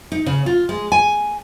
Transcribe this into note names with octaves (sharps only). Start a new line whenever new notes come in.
D#4
C#3
F4
G#3
G#5